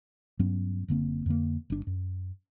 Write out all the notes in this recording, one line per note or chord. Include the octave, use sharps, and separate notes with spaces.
G2 F#3 B3 C#4
F#1 D3 A#3 C4
F2 D3 A#3
G1 D4
F#2